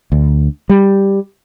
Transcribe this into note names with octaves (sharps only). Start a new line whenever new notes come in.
D2
G3